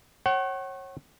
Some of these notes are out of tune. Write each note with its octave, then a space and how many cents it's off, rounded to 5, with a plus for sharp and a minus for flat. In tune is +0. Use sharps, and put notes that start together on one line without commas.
C#5 -30 F#5 +35